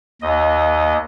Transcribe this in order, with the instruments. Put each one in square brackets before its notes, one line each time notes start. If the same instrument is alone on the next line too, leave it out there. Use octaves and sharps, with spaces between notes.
[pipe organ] D#2 D#5